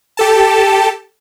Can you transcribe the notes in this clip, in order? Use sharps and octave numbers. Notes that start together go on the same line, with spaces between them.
G4 A4 A5